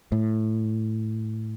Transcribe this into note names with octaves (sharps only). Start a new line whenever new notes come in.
A2